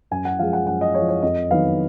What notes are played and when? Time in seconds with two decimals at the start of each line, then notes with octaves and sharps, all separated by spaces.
0.11 F#2 G#5
0.25 F#5
0.39 F3 G#3 F5
0.53 F#5
0.67 F#2 F#5
0.81 D#5
0.95 F3 G#3 C#5
1.09 C#5
1.22 F2 D#5
1.50 D#3 F#3 B3 F5